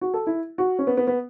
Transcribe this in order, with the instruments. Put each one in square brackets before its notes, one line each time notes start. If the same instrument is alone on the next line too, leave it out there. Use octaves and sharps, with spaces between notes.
[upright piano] F#4
A4
E4
F#4
C#4
B3
B3
B3